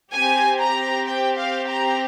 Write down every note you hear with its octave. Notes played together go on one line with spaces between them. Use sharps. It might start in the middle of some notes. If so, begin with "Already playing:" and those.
C4 G4 G#5
A#5
G5
F5
A#5